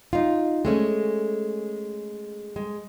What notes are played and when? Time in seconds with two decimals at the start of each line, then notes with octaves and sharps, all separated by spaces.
0.13 D#4 F4
0.65 G#3 A3 C#4
2.56 G#3